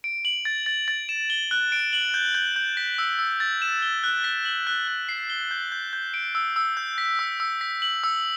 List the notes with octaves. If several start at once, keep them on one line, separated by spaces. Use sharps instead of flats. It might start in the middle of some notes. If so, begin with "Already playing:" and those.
D7
F#7
A6
A6
A6
E7
G7
F#6
D7
F#7
G6
G6
G6
B6
E6
E6
A6
E7
G7
F#6
B6
F#7
F#6
F#6
C7
G7
G6
G6
G6
D7
E6
E6
G6
B6
E6
E6
B6
F#7
E6